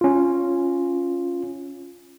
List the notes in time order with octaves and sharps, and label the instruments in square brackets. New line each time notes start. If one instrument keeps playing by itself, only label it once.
[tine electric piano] C#4 F4